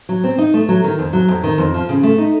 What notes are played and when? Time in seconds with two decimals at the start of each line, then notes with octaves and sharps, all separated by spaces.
0.09 F#3
0.24 C4
0.38 D#4
0.54 A3
0.68 F#3
0.84 D#3
0.98 F2
1.13 F#3
1.28 F2
1.43 D#3
1.58 F2
1.74 F3
1.89 C#3
2.03 A3
2.18 D#4